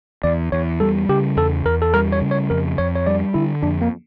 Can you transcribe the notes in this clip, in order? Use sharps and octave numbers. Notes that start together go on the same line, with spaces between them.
E2 D5
E2 C#5
G3 A4
C#3 G4
E2 A4
E2 A#4
A4
G3 A#4
C#5
C#3
C#5
F2 A#4
F2 C#5
C#5
G3 D5
D3 E4
F2 D4
A#3